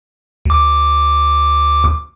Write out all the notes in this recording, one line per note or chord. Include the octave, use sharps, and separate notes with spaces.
D2 D6